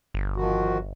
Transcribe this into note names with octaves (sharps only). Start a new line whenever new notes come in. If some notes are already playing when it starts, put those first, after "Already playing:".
G1
D#3 F3 F#4